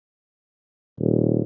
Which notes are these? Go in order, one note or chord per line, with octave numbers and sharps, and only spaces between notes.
D#1